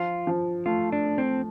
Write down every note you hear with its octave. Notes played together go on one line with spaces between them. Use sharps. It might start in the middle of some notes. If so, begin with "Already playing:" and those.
Already playing: F3 F4
F3
A3 F4
D4
A3
C4